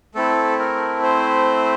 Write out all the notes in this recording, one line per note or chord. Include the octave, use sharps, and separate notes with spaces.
A3 C4 E4 A4
A#4
C5